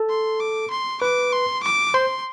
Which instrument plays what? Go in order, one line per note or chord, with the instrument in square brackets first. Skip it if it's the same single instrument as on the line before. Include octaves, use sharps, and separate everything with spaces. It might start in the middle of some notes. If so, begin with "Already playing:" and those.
Already playing: [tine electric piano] A4
[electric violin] C6
D6
C6
[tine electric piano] B4 [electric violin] D6
[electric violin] C6
D6
[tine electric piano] C5 [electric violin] C6